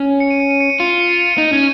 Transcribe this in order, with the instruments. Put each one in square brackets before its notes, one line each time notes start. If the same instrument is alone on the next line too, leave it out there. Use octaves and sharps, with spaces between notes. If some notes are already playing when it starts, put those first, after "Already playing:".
Already playing: [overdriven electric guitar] C#4
[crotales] C#7
D#7
C#7
D#7
C#7
D#7
[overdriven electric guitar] F4 [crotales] C#7
[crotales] D#7
C#7
D#7
C#7
[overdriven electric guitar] D#4 [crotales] D#7
[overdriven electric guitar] C#4